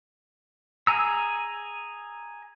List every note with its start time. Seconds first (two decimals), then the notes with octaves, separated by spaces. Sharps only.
0.87 G#4 G#5 A#5 E6